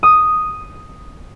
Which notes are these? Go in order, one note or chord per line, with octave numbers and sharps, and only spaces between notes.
D#6